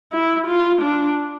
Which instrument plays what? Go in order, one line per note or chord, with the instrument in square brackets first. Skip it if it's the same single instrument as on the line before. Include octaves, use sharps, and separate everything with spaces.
[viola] E4
F4
D4